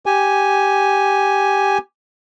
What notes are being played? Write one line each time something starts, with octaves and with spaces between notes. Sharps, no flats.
G4 G#5